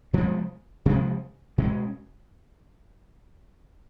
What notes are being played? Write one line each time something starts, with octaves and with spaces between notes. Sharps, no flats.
C3 F3 G#3 B3
C3 F3 G#3 B3
B2 G#3 C#4